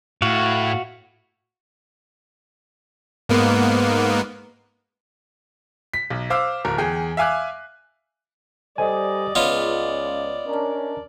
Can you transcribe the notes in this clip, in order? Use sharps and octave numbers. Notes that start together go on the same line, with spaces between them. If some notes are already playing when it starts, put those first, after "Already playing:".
A2 F#4 F5
G#2 A#3 B3
B6
B1
C5 F5 D6 E6
D1 A#4
E2 G#4 G5
E5 F5 G#5 D6 F#6
G3 A4 C5 D5 D#5 G#5
C#2 B3 F4 C#5 D#5
C#4 D4 A#4